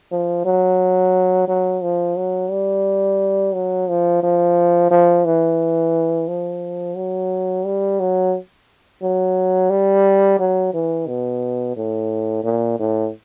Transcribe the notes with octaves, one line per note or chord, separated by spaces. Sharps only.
F3
F#3
F#3
F3
F#3
G3
F#3
F3
F3
F3
E3
F3
F#3
G3
F#3
F#3
G3
F#3
E3
B2
A2
A#2
A2